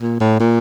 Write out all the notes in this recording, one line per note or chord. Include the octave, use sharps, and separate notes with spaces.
A#2
A2
A#2